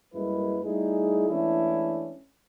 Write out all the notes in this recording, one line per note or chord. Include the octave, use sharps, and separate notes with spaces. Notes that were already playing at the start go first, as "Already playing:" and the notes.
F#2 G3 G#3 A#3 E4 B4
G3 A3 D#4 E4 G#4
E3 G#3 A3 C#4 D4 E4